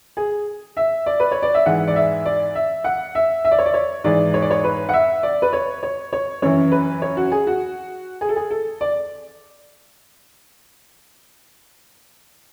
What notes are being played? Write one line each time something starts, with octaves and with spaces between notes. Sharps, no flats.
G#4
E5
D5
B4
C#5
D5
E5
G#2 E3 F#5
D5
E5
D5
E5
F#5
E5
E5
D5
C#5
D5
C#5
G#2 E3 D5
C#5
D5
C#5
B4
F#5
E5
D5
B4
C#5
C#5
C#5
F#2 E3 C#5
B4
C#5
F#4
G#4
F#4
G#4
A4
G#4
A4
D5